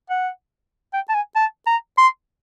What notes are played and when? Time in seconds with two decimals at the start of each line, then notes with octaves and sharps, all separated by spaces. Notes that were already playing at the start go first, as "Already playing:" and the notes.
0.10 F#5
0.94 G5
1.09 A5
1.15 G#5
1.36 A5
1.67 A#5
1.98 C6